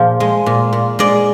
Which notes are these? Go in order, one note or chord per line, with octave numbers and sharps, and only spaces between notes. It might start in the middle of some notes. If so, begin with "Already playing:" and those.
Already playing: A#2 F3 G#4
G#3
A#2
A#2
G#3 D5